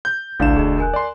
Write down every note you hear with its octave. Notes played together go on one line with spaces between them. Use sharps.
G6
A1 D2 D4 E4 F5 E7
E1 G#4 D#5
A#4 G#5 F#6
D5 C6